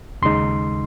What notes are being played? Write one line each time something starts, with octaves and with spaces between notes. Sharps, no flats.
D#2 C#3 G#3 D#4 C6